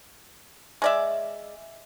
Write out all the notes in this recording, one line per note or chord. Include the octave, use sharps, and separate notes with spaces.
G#3 D5 E5